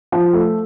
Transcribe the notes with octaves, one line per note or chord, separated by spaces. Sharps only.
F3
A3